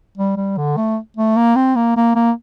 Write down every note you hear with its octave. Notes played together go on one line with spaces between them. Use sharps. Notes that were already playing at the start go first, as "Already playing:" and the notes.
G3
G3
D3
A3
A3
A#3
C4
A#3
A#3
A#3